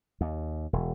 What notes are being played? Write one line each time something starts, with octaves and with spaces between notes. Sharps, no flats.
D#2
E1